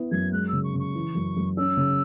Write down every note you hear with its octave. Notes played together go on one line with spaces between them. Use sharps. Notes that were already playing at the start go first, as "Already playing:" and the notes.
Already playing: B3 E4
F#2 G#6
G#3 F#6
E6
C#3
C#6
C#3 C#6
E3
F#2
F#2
C#4 E6
C#3